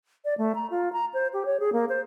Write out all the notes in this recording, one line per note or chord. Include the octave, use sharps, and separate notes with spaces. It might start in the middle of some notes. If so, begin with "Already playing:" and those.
D5
A3
A#5
F4
A#5
C5
G4
C#5
G#4
A#3
C5